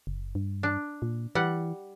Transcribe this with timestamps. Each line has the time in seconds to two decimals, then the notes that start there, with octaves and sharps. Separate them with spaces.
0.07 F#1
0.35 G2
0.63 D4
1.02 A#2
1.35 E3 G3 F#5